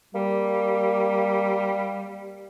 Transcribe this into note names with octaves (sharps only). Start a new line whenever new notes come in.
G3 A#3